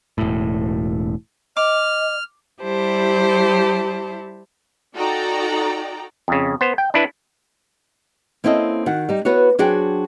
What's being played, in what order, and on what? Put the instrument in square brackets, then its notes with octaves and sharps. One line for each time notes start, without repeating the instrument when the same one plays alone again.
[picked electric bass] E1 A2
[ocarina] D#5 [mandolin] D6 [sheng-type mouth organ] F6
[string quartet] G3 E4 G4 C5 A5
[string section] D#4 F#4 A4 D5 G5 A#5
[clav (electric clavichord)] F2 C#3
B3 C5
G5
D4 E4 B4
[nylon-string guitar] A#3 C4 C#4 E4 A4 D#5
D#3 F#4 F#5
G3 D#4
B3 E4 F#4 B4 C#5
F#3 D4 F#4 G#4 C5 G5